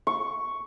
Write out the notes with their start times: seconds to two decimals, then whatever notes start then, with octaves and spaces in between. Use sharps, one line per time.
0.07 C#6